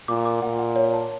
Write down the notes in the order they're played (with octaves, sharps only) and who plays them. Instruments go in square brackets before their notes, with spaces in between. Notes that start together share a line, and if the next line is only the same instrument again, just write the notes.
[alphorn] A#2 [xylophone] D6
[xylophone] D6
[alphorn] A#2 [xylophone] F#5
[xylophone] F#5
C#5
A5